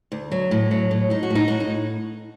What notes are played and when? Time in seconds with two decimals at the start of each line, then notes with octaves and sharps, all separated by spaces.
0.12 D2
0.32 F#3
0.51 A2
0.71 F#3
0.91 A2
1.10 A2 D#4
1.23 F#4
1.30 A2
1.35 D#4
1.48 A2 F#4
1.60 D#4